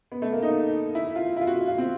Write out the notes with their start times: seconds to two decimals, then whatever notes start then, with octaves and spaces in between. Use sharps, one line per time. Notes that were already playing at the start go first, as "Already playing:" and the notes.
0.12 B3
0.22 A3
0.33 A#3
0.43 D#4
0.95 E4
1.16 F4
1.37 E4 F4
1.47 F#4
1.68 F4
1.78 C4